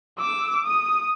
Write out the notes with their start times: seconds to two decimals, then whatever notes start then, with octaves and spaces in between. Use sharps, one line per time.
0.18 D6 E6
0.64 D#6